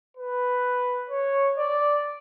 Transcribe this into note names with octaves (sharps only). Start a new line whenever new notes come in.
B4
C#5
D5